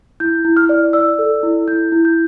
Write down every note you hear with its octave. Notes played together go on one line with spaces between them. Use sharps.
E4 G6
E4
F6
D5
D5 E6
A4
E4
E4 G6
E4
G6